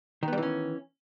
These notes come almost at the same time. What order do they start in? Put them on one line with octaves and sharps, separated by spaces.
D#3 B3 G3 E3 C#4